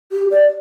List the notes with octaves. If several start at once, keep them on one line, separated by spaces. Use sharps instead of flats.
G4
D5